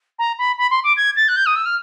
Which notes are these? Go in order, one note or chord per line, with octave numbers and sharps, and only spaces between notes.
A#5
B5
B5
C6
D6
G#6
A6
F#6
G6
D#6
E6
F6